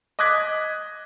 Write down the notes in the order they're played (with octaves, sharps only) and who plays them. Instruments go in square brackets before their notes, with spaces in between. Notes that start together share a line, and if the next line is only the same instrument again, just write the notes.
[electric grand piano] D#5 D6 D#6 F#6 G#6 B6